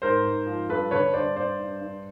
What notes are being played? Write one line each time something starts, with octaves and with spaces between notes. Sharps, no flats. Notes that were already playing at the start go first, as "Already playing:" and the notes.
G#2 A#4 C5
G#2
F3
G2 A4 B4
D3 B4 C#5
G2 C5 D5
G2 C5 D5
G2
G2